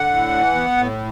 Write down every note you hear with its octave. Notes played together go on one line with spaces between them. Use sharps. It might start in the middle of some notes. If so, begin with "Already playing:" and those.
Already playing: D3 F#5
A2
E3
B3
A2